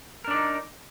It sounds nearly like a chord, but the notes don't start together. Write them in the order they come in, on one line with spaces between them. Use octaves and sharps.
A#4 D4 D5 D#4